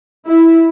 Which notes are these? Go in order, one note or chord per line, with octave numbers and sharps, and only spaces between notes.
E4